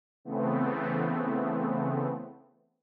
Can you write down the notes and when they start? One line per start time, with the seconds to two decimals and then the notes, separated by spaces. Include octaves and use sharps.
0.25 C#3 E3 A3 B3 C4